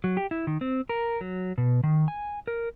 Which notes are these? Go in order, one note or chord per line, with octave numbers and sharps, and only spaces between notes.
F#3
G4
E4
D#3
C4
A#4
F#3
B2
D#3
G#5
A#4